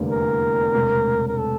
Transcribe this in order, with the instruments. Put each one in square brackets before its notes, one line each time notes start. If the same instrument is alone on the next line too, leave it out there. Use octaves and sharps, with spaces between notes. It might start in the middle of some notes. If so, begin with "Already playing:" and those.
Already playing: [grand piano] F1 E2 D3 G3 A#3
[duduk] A#4
[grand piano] E1 D2 C3
[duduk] A#4
A4